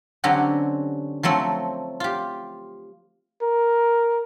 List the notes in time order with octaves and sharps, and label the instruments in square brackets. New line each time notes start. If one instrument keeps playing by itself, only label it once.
[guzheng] D3 F#3 C4 C#4 F#4 G4
F3 F#3 A3 C4
F4 G4
[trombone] A#4